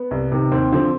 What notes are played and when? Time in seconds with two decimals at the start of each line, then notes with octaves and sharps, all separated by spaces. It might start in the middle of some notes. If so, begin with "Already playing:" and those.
Already playing: B3
0.11 C2
0.32 C3 D#3
0.52 D#2 C4
0.72 D3 F3 C4